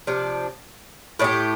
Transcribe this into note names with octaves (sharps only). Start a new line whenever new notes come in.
C3 F3 D4
A2 A3 D4 G4